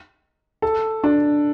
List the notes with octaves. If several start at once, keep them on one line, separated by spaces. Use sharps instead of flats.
A4
D4